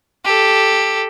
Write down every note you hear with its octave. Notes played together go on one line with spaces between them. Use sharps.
G4 A4